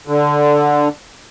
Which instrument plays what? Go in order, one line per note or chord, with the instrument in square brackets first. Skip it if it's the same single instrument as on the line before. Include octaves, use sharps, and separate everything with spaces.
[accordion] D3